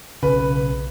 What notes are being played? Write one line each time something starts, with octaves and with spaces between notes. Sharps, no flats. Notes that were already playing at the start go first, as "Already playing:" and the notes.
B1 C#3 B4